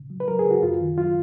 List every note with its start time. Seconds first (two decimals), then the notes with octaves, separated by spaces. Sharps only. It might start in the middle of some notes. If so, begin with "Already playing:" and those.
Already playing: C#3
0.10 F#3
0.20 B4
0.28 F#3 A#4
0.39 G#4
0.45 C#3
0.51 F#4
0.62 F#2 F4
0.81 D#3
0.97 F#3 F4